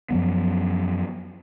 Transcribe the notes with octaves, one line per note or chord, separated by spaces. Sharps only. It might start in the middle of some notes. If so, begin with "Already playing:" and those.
F#2 F3 F#3 B3